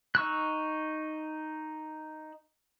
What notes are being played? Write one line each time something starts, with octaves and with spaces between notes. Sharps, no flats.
D#4 C#6 E6 F#6